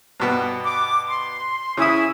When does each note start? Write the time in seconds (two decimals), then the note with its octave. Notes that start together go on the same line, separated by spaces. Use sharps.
0.20 G2 B2 B3
0.64 D6
1.07 C6
1.77 C#3 E4 G#5 D#6